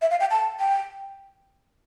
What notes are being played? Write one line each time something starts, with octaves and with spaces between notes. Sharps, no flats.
E5
F5
G5
A5
G5